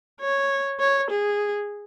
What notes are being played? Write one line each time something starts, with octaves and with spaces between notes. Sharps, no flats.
C#5
C#5
G#4